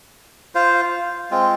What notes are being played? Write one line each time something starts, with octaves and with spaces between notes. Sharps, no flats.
F4 C5 F5
G#3 C4 F4